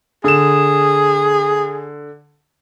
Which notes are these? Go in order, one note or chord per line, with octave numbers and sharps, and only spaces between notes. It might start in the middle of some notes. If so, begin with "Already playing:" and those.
D3 G#4 E7